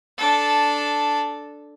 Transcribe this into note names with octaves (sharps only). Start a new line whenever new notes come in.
D4 A4